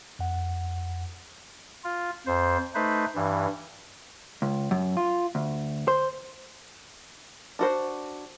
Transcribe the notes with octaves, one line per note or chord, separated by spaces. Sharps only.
F2 F#5
F4
F2 C5
A3 D#4 B4 C5
G2 E3
C#2
F#2
F4
D2
C5
D4 F#4 C5